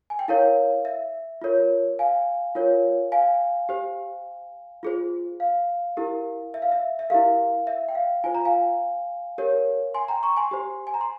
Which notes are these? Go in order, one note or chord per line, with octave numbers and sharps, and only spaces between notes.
G#5
G5
E4 A#4 C#5 F5
E5
F4 A#4 C#5
F5 G#5
F4 A#4 C#5
F5 G#5
G4 C5
F4 G#4 C5
F5
E4 G4 A#4
E5
F5
E5
E5
E4 G4 A#4 F5
E5
G5
F5
F4 C5 G#5
A#5
F5 G#5
G4 A#4 C#5
G#5 C6
G5 A#5
A#5 C#6
G#5 C6
G4 C5
G#5
A#5
C6